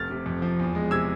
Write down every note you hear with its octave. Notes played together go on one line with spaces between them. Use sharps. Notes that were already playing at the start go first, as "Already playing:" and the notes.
Already playing: F1 A3 F6 A6
C3
F2
F3
E2
G#3
C3 E6 G#6